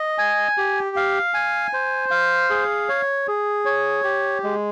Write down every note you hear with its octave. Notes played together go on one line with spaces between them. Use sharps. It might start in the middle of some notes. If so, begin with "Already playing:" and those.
Already playing: D#5
G#5
G4
F5
G#5
C5
F5
G#4
C#5
G#4
C#5
G4
G#3